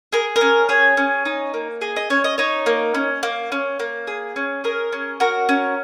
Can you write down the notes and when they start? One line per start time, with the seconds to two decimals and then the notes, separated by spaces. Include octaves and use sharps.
0.12 G#4 A#4
0.36 A#4
0.41 C#4
0.69 G#4 C#5
0.97 C#4
1.25 D#4
1.54 A#3
1.81 G#4 D#5
1.96 D#5
2.10 C#4 C#5
2.24 D#5
2.38 D#4 C#5
2.66 A#3
2.95 C#4
3.23 A#3
3.52 C#4
3.79 A#3
4.07 G#4
4.36 C#4
4.64 G#4 A#4
4.92 C#4
5.20 F#4 A#4
5.49 C#4